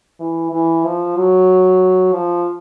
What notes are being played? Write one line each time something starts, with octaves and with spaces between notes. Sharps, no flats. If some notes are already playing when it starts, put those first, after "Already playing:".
E3
E3
F3
F#3
F3